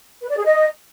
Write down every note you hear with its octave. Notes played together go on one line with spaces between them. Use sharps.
B4
D5
G#4
D#5